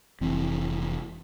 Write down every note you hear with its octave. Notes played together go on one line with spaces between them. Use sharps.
F1 E3 C4